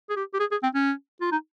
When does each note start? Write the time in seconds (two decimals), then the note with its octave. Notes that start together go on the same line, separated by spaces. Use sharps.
0.09 G#4
0.16 G4
0.34 G4
0.40 G#4
0.51 G#4
0.63 C4
0.74 C#4
1.21 F4
1.32 D#4